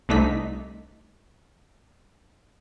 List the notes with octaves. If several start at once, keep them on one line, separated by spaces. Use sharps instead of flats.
C2 A3 D4 D#4 D#5 B6